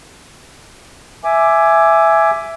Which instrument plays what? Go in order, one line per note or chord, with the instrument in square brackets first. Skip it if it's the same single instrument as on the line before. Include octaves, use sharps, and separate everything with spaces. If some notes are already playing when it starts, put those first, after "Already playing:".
[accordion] E5 G#5 D6